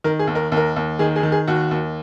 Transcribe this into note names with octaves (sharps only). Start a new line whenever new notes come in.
D#3 A#4
G#4
D#2
A#4
D#2 A#4
D#2
D#3 G#4
G#4
D#3
G#4
D#2 F#4
D#2